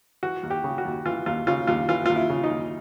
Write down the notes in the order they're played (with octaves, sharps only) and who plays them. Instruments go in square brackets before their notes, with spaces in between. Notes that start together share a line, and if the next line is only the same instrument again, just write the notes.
[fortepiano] E3 F#4
D#2
G4
C#3
F#4
D#2
E3 F4
D#2 F4
C#3 F4
D#2 F4
E3 F4
D#2 F4
E4
C#3
D#4
D#2